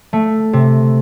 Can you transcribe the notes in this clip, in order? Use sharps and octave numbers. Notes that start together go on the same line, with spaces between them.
A3
C3